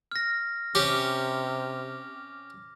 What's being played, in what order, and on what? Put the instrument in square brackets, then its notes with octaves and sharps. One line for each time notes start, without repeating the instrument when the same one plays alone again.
[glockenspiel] F6 A#6
[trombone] C3 [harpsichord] C#4 G4 [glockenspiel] D6